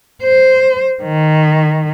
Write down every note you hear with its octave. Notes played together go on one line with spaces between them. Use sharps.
C5
D#3